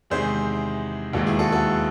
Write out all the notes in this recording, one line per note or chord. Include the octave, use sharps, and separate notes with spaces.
E2 C3 D#3 G#3 G#4 C5
E1 D#2 D#3 G#3 F#4 A4
E4 G#4
F#4 A4
F#4 A4